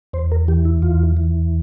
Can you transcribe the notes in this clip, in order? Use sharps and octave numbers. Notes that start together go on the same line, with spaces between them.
E2 C5
A#4
E3 G4
E4
E2 F4
E3